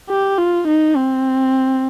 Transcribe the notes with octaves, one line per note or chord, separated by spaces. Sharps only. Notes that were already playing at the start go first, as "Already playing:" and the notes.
G4
F4
D#4
C4